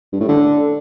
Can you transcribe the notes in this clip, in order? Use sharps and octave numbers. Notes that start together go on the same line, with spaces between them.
G2
A2
D3